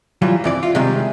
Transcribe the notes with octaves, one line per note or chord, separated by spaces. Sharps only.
E3 F#3 G3 F4
F2 E3 D5
F4
C3 D#3 G3 G#3